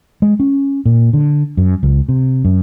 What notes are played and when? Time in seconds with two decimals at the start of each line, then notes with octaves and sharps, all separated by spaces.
0.22 G#3
0.40 C#4
0.85 A#2
1.13 D3
1.57 F#2
1.83 C#2
2.09 C3
2.45 F#2